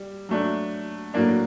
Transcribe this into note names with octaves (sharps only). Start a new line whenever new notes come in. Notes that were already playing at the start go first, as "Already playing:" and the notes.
Already playing: G3
F#3 A3 D4
A2 F#3 A#3 D4